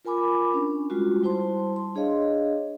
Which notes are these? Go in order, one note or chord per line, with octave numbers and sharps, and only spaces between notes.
F4 A#4 G#5 B5 D6
C#4 D4
G3 G#3 F4 F#4
G3 E4 C5 A5 C6
C6
D4 G#4 C#5 D#5 F5